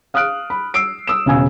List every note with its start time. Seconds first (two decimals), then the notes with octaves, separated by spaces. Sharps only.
0.14 F5 D#6 F6 F#6 D7
0.50 B5
0.74 E6 C7 D7
1.07 D#6 E6 E7
1.26 E1 C#3 F5 G#5 E6